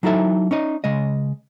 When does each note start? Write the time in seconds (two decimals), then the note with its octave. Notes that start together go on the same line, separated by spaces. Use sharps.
0.03 F#3 D#4 E4 A4 E5
0.51 C#4 D#4 D#5
0.84 C#3 G#3 D#5